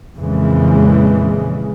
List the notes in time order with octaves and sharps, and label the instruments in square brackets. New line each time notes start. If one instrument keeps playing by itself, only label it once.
[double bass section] F2 A#2 C#3 E3 G#3